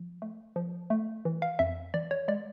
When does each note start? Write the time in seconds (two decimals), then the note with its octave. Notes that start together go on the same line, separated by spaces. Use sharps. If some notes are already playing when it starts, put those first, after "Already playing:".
Already playing: F3
0.22 A3
0.56 F3
0.90 A3
1.25 E3
1.42 F5
1.59 F2 E5
1.94 E3 D5
2.11 C#5
2.28 G#3 D5